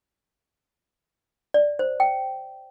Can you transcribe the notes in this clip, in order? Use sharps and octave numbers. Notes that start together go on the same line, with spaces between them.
D5
C5
G5